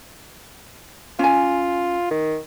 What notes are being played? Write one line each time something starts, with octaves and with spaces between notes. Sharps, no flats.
C#4 F4 G#5
D#3